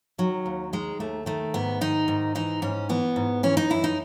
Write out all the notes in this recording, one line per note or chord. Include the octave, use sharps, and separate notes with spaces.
D#3 F#3
D#2
D#3 G#3
D#2 A3
D#3 A3
G#2 B3
D#3 D#4
G#2
E3 D#4
G#2 C#4
E3 B3
G#2
E3 C#4
D#4
F#2 E4
D#4